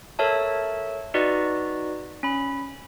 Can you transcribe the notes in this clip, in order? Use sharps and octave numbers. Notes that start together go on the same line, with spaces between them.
A4 A#4 C#5 E5 A5
D#4 F#4 B4 D5 D#5
C#4 B5